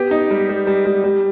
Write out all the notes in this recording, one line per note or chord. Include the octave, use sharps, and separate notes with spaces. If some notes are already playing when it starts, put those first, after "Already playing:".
Already playing: B3 G4
D#4
G3
G3
G3
G3
G3